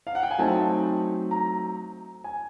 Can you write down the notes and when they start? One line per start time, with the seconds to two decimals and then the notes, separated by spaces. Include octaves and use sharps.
0.07 F5
0.15 F#5
0.23 G5
0.31 G#5
0.38 F#3 A3 C4 D#4 A5
1.31 A#5
2.24 G#5